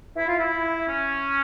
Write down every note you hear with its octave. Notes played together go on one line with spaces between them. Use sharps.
E4
F4
E4
C#4